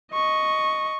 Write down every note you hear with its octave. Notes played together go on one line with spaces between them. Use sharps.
D#5 C#6